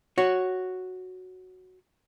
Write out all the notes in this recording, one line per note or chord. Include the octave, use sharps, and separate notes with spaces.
F#4 C#5